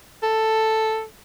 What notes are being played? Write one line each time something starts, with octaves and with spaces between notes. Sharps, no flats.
A4